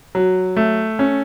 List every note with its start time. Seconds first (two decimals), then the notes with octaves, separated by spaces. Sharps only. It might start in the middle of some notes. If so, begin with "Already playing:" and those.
0.15 F#3
0.56 A3
0.99 C#4